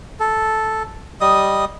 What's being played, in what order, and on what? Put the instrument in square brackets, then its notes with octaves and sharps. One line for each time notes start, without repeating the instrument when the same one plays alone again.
[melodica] A4
G3 D#5 D#6